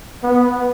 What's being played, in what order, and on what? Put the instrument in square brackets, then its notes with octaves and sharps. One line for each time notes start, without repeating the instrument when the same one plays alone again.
[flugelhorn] B3